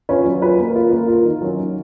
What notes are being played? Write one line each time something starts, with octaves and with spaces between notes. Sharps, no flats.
C#4 F4 B4
F#3
C#4 F4 B4
A#3
F4 A#4
A#3
F4 A#4
D#3
F#3 C#4 F#4
D#3